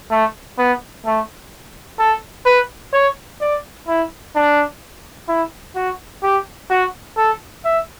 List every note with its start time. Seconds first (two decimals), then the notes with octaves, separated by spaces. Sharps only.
0.10 A3
0.58 B3
1.05 A3
1.99 A4
2.46 B4
2.93 C#5
3.41 D5
3.88 E4
4.35 D4
5.28 E4
5.76 F#4
6.23 G4
6.70 F#4
7.17 A4
7.65 E5